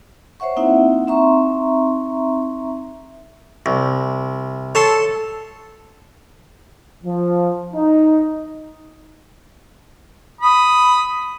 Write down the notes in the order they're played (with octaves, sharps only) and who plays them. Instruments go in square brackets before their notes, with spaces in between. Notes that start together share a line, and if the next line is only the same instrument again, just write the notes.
[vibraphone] C5 C#5 E5 F#5 C#6
A#3 C4 D#4 E4 E5 F#5
C4 D#4 E5 A#5 C6 C#6
[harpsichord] C2
[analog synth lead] A4 [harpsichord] C#5 A5 C6
[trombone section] F3
D#4
[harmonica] B5 D#6